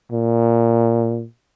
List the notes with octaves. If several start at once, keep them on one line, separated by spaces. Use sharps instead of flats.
A#2